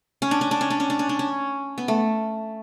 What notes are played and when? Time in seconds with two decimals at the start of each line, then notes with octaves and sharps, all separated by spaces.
0.22 C#4
0.31 D4
0.41 C#4
0.51 D4
0.61 C#4
0.70 D4
0.80 C#4
0.90 D4
0.99 C#4
1.09 D4
1.19 C#4
1.78 B3
1.88 A3